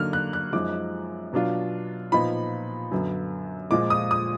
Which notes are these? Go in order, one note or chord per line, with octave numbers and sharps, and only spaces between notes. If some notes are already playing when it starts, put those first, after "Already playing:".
Already playing: D3 F#3 A#3 D#4 F6
F#6
F#6
F#2 F3 G#3 D#4 D6
B2 F#3 D4 F4
A#2 F3 B3 D#4 B5
F#2 D3 F#3 B3
A#2 F3 G#3 D6
D#6
D#6